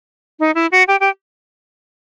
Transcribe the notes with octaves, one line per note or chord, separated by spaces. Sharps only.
D#4
E4
F#4
G4
G4